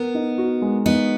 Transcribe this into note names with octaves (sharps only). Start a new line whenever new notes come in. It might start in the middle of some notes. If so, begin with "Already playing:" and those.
Already playing: B3 A#4
D#4
F#4
G#3
B3 D#4